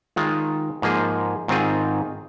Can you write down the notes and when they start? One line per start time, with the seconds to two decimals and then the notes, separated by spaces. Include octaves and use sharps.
0.16 D#3 G#3 F4
0.82 G#2 F3 A#3 G#4
1.48 G#2 D#3 C4 F4 G#4